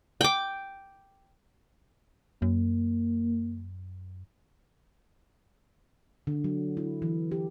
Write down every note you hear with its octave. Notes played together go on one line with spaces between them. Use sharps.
G5 D6
F#2 A#3
D3
F#3
E4
E3
G4